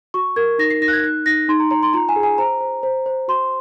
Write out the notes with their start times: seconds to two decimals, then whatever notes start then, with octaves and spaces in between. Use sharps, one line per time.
0.14 F#4 C#6
0.36 A#4 G#6
0.58 D#4 A#6
0.70 C7
0.81 D#4 A#6
0.88 F#6
0.93 G#6
1.04 D#4 F#6
1.26 D#4 A#6
1.49 D#4 C6
1.60 A#5
1.71 C#5 A#5
1.83 C6
1.93 F4 A#5
2.09 G#5
2.16 G#4
2.23 G#5
2.38 C5 A#5
2.61 C5
2.83 C5
3.06 C5
3.28 F#4 C6